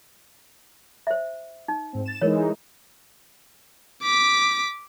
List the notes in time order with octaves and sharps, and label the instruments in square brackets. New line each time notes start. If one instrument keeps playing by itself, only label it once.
[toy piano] C5 E5
D#4
[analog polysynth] G#2 C4
A6 E7
[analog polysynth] E3 G#3 D#4 [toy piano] A#4 C#5
[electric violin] D6 B6